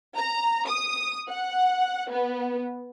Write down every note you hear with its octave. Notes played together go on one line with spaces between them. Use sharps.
A#5
D#6
F#5
B3